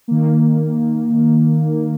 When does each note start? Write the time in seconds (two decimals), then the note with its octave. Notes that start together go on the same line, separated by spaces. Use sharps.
0.08 D#3 A#3